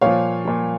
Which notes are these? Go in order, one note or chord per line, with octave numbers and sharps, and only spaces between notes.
A#2 F3 C#5 F5
A#2 F3